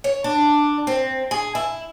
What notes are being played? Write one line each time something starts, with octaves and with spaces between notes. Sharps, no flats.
C#5
D4
C4
G#4
E4